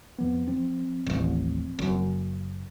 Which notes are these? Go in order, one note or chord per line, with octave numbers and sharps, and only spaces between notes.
F2 F3 B3
F3 C4
D#1 A1
F#1 F#2